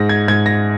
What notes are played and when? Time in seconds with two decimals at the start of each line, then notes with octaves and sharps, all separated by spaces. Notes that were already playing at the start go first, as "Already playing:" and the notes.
Already playing: G#2 A#6
0.09 G#6
0.28 G#2 G#6
0.46 A#6